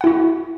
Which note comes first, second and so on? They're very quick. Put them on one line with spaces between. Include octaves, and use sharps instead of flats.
F#5 E4 F#4